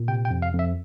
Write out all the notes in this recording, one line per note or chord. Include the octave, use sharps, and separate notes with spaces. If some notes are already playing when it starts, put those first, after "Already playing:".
Already playing: A#2
C3 G5
G5
F2
F5
F2
E5